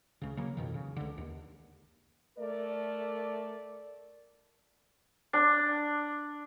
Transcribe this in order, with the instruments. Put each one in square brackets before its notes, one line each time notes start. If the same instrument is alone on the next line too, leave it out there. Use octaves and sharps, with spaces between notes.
[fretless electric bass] C#2 C#3
C#3 F#3 A#3
F2 B2 D#3
C#3
C#2 D3
D#2
[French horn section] A3 A#4 D5
[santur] D4